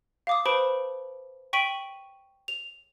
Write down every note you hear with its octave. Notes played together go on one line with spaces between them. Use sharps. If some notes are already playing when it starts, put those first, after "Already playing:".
F5 D6 D#6
B4 C5 A5 B5 D7
G5 C#6 B6 D7 D#7 F#7
F7